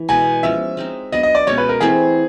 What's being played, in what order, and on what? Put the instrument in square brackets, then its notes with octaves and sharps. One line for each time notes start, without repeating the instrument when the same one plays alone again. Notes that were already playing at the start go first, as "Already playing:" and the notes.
Already playing: [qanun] E3
[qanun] B2 G#3 B3 [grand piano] G#5
[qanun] F3 G#3 C#4 [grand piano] E5
[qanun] G#3 C4 D#4
[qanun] F#3 B3 D4 [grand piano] D#5
[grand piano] D#5
D5
[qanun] B2 G#3 C#4 [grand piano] C#5
[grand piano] B4
A#4
[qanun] E3 A3 C4 E4 [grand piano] G#4